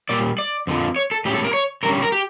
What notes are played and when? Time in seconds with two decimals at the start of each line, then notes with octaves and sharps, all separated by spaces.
0.09 A#2 G3 D5
0.38 D5
0.67 F2 D3 F3
0.96 C#5
1.11 A4
1.25 A2 G3 C#4 G4
1.34 A4
1.44 A#4
1.54 C#5
1.83 D3 G3 C#4 A#4
2.02 A#4
2.12 G4